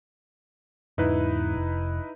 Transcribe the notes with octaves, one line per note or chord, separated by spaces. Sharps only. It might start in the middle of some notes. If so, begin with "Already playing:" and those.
E2 G#2 C#3 D#4 E4 B4
F1